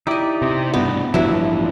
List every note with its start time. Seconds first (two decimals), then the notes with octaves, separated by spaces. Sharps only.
0.07 D#4 E4 G4 D5 D#5
0.42 C3
0.74 G2 B2 B3
1.14 A1 G2 F3 F#3 B3 E4 E5